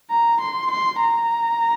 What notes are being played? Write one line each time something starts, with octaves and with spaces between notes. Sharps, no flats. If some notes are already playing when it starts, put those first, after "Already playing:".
A#5
C6
C6
A#5